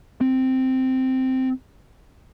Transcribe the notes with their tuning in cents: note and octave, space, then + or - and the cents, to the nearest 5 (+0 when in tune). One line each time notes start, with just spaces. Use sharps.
C4 -5